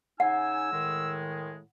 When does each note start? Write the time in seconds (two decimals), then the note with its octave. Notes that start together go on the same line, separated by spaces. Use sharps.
0.20 C#3 D#4 F#5 G#5 E6
0.72 A2 D#3 G#3